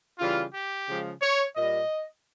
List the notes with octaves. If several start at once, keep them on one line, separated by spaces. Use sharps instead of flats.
C#3 E3 G3 F4
G4
C#3 F3 G#3
C#5
A#2 G3 D#5